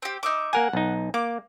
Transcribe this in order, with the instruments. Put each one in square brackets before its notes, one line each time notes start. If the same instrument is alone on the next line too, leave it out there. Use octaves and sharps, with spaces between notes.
[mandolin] C4 G4
D#4 E5 D6
[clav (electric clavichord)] A#3 A#4 G#5 [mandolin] F#5
[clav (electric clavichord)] B1 D#4
[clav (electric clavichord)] A#3 [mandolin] D6